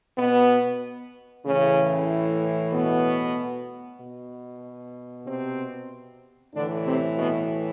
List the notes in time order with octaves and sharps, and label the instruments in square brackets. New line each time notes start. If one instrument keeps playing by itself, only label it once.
[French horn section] B2 B3
A2 C#3 E3 C#4
B2 B3
B2
C3 C4
A2 D3 E3 D4
C3 C4
B2 B3